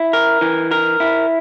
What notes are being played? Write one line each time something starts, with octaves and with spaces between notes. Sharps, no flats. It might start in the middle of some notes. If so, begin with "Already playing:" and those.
Already playing: E4
A#4
E3
A#4
E4